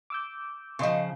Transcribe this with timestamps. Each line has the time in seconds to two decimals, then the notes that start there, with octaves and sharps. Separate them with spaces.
0.10 D6 E6 G6
0.79 C#3 F3 D#5 C6 C#6